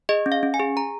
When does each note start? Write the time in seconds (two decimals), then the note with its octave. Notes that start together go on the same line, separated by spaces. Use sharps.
0.09 G#4 D#5
0.26 C#4
0.32 F5
0.43 C#4
0.54 G#5
0.60 G#4
0.77 G#4 A#5